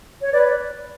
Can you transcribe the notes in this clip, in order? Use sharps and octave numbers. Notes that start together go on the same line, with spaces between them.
C#5
B4 D5